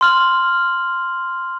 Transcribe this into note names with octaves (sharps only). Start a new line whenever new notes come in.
C6 F6 F#7